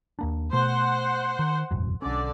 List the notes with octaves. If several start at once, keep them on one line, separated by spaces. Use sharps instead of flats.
D#2 A#3 D4
B2 A3 C5 F#5
D#3
E1 A1 F#2
B1 D3 C#4 D5